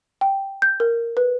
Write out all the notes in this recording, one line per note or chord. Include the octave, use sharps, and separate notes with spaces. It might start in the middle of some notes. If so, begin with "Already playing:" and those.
G5
G6
A#4
B4